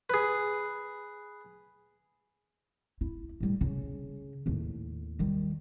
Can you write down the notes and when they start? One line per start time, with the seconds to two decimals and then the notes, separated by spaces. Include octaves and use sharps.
0.10 G#4 B4
3.01 E4
3.40 A2 G3
3.61 C#3
4.46 D#2 A2
5.19 D#3 G3